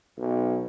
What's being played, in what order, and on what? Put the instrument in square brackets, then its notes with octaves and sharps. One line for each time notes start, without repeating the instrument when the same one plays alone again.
[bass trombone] B1